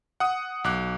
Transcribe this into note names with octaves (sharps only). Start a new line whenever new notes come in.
F#5 D#6
B1 D6 F#6